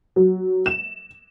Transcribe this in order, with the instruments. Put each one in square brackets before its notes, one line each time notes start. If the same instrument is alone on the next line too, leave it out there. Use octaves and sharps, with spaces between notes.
[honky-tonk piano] F#3
E7